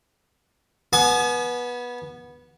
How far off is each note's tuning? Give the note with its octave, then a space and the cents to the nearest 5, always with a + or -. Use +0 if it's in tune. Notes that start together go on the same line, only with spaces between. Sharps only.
B3 -15 G#5 +40